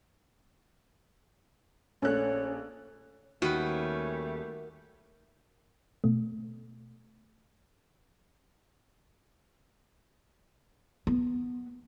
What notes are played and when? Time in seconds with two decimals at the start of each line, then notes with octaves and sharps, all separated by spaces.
2.02 A#1 A3 C#4 A4 C#5 F#6
3.42 D#2 D#3 G3 A3 C#4 F#4 B4
6.04 B2 A3
11.07 B3